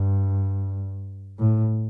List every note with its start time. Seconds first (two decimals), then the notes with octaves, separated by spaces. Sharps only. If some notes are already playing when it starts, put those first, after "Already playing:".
Already playing: G2
1.39 A2